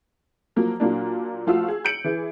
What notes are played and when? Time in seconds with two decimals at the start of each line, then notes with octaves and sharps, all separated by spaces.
0.56 F3 F#3 A#3
0.80 A#2 F#3 A#3 D4
1.47 F3 A3 F4 F#4 F5 E6
1.68 G#4
1.85 G6 C#7 D7 F#7
2.04 E3 G#4